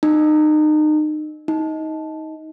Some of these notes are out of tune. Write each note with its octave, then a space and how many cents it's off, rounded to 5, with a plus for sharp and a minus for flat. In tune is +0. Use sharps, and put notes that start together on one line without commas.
D#4 -30
D#4 +20